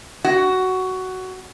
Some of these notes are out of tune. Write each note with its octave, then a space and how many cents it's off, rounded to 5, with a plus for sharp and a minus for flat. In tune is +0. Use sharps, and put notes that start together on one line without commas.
F#4 +10